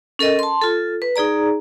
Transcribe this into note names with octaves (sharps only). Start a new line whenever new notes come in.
C#4 A4 A#4 D#5
A5 C6
F4 A4
B4
D#4 G#4 D5 A#5